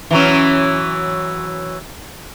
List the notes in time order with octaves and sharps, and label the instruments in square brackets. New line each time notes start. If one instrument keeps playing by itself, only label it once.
[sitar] E3 F#3 C#4